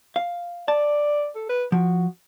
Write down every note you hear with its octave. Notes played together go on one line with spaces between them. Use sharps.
F5
D5 A5
A4
B4
F3 F#4